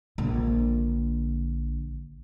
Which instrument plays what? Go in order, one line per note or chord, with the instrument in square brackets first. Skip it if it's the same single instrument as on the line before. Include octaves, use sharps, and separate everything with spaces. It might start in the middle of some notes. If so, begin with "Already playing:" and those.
[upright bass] A#1 D3